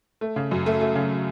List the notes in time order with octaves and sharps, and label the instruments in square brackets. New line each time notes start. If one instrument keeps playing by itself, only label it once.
[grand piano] A3
C#3
F#2
A3
A3
C#3